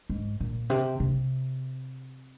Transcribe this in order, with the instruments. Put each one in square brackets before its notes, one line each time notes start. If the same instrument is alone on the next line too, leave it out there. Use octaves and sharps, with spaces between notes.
[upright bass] G#2
A#2
C3
C3